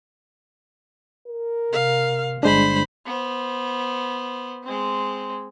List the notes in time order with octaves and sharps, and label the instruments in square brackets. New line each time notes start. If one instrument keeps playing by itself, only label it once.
[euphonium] A#4
[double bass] C3 [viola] F5
[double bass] G1 [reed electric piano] G#3 D4 [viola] C5 B5
[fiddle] B3 C5
G#3 C4